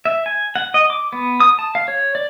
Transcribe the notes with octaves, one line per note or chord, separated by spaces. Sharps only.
E5
G#5
F#5
D#5
D6
B3
D#6
A5
F5
C#5
D5